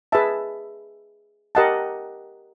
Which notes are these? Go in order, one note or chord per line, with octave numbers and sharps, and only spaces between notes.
G#4 B4 E5 A5
G4 A#4 D#5 F#5 A5